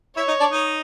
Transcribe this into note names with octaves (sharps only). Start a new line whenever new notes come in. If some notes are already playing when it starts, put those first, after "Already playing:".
E4 C#5 E5
D#4 D#5
D4 D5
D#4 D#5